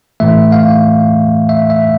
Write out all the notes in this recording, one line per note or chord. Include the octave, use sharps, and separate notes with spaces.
A2 E3 A3 E5
F5
E5
E5